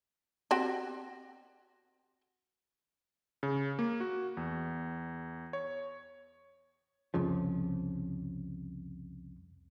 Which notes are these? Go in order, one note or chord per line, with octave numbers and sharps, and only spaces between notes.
C4 F#4 G4
C#3
A#3
F#4
E2
C#5
C2 F2 C#3 F3